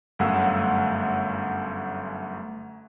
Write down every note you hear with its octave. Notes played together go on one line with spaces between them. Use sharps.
G1 F#2 A3 F5 F#5 E6